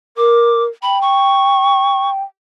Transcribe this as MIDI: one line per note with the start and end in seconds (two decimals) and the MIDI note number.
0.17 0.67 70
0.17 0.63 86
0.83 2.22 79
0.83 1.00 83
1.02 2.10 85